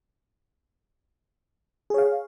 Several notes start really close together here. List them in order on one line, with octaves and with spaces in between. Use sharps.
G#4 C#5 F5